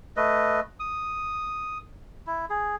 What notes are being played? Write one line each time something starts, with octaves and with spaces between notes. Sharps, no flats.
A3 B4 D#5
D#6
E4
G#4